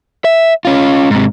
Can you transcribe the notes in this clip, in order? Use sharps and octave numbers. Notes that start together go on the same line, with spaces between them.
E5
C#4 F4
G#2 C3